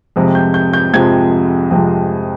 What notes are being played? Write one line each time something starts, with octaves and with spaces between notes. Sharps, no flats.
F2 C3 F3 G#3
G6
G6
G6
F2 C3 F3 G#3 G#6
F2 C3 F3 G#3